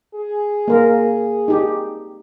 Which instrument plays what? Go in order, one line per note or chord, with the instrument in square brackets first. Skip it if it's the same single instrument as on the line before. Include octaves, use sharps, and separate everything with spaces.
[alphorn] G#4
[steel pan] A#3 A#4
D#4 G4